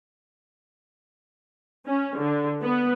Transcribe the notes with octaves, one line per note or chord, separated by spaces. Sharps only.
C#4
D3
B3